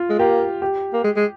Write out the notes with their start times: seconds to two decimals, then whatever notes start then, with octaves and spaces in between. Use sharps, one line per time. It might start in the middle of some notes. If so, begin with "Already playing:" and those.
Already playing: F4
0.10 G#3
0.19 A#3 G4
0.62 G4
0.93 A#3
1.04 G#3
1.16 G#3